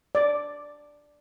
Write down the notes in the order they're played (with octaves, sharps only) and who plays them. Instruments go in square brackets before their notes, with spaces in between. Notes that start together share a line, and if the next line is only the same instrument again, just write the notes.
[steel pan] D5